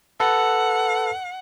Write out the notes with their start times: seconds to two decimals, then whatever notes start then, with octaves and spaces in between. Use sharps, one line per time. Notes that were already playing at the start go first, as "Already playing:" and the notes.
0.20 A4 B4 F#5